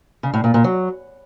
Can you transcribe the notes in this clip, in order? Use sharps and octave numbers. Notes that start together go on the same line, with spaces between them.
C#3
A2
A#2
A#2
F#3